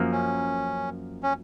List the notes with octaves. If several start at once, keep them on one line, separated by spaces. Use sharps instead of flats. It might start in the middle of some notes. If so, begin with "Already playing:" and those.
Already playing: F#2 F3 A#3
C#4
C#4